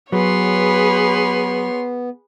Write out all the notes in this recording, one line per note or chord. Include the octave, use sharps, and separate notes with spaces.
F#3 B3 G#4 B4 C#5 C6